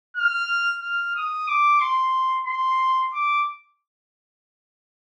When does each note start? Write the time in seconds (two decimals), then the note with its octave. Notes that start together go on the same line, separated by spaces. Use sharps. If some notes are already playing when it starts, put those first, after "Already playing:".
0.16 F6
0.82 F6
1.15 D#6
1.48 D6
1.80 C6
2.46 C6
3.13 D6